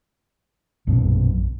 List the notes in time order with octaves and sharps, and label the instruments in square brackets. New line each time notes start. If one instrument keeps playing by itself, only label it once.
[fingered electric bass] A#1 F#2 B2